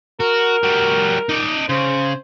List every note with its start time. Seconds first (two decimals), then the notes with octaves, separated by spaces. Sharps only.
0.20 F#4 A#4
0.63 G3 F#4
1.29 D#4 D5
1.69 C#3 C5